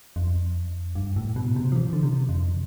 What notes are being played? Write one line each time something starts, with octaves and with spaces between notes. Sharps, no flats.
F2
G2
A2
B2
C3
F3
E3
D3
C3
F2